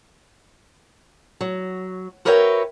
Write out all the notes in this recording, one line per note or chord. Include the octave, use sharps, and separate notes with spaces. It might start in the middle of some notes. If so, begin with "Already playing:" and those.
F#3
F#4 A#4 B4 C#5 E5 G5